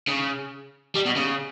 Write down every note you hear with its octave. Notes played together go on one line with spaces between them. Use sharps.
C#3
G3
B2
C#3